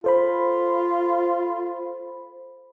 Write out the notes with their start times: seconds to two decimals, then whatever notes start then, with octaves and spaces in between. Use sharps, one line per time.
0.04 F4 A4 C5 B5